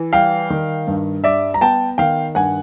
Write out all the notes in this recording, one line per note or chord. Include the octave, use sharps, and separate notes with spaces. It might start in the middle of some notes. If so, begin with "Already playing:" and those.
Already playing: E3
G3 F5 G5
D#3
G2
G3 D5 E5
A#5
B3 G5 A5
D#3 F5 G5
G2 F#5 G#5